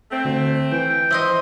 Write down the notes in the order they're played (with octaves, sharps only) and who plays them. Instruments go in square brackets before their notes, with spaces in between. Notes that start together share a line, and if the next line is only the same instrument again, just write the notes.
[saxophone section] A3 C4
[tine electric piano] D2
[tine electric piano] E3 [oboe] G5
[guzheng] F3 C5 D#5 [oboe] E5